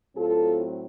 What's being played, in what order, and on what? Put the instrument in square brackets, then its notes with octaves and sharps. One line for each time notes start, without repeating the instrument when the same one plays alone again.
[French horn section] A2 F#3 C4 F4 A4